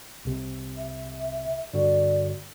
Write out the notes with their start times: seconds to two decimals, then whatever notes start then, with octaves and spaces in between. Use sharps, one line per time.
0.25 C2 C3
0.77 E5
1.74 G2 D3 F#4 D5